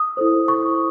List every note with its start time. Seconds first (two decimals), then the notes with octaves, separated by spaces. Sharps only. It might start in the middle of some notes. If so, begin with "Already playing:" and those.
Already playing: D#6
0.17 E4 A4 C5
0.48 C#6